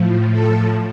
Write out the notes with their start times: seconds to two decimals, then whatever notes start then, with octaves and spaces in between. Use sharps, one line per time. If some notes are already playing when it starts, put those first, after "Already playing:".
Already playing: A2 F3
0.32 A4